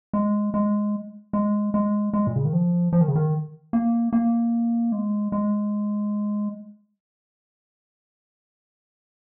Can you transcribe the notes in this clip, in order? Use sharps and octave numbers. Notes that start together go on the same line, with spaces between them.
G#3
G#3
G#3
G#3
G#3
A#2
C#3
D#3
F3
F3
D#3
C#3
D#3
A#3
A#3
G#3
G#3